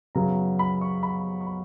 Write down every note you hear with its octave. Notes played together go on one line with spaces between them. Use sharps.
F#2 C#3 F#3 B3 A#5
B5
C#6
B5
C#6
B5